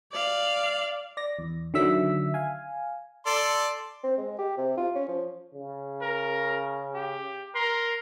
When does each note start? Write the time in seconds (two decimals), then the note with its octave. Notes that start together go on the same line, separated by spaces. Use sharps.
0.12 D5 F5
1.17 D5 A#6
1.39 E2
1.74 D3 D#3 F#3 E5 E6 B6
2.34 F5 G#5
3.26 A4 D5 C6
4.04 C4
4.18 G#3
4.38 G4
4.57 C3
4.77 F4
4.95 C#4
5.08 F3
5.55 C#3
6.02 A#4
6.95 G4
7.55 A#4 C6